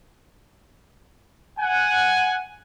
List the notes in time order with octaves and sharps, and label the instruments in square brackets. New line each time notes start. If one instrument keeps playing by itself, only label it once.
[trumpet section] F#5 G#5